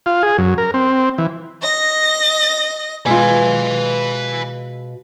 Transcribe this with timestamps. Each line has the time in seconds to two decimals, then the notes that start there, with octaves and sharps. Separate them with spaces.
0.06 F4
0.23 G#4
0.38 F#2
0.58 A#4
0.74 C4
1.18 E3
1.62 D#5 A#6
3.06 B2 G#3 F4 B4 G#5